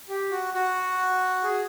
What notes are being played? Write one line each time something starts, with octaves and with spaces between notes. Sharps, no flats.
G4
F#4
F#4
G#4